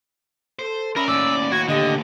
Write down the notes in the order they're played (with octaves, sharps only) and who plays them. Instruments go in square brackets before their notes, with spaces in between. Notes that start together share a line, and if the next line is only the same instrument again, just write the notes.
[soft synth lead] A4 [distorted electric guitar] C5
[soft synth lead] C#4 [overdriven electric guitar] A#4 [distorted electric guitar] D5 E5 [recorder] B5
[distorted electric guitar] D#2 A2 [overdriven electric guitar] D5 [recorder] E6
[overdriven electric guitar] F#4 [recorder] G#6
[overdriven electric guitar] D3 [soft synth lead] G4 [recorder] D#5